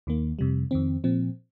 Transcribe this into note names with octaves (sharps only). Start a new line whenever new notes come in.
D#2 D#3 A#3
F2 C3 G3
F2 D#3 C4
A#2 F3 C4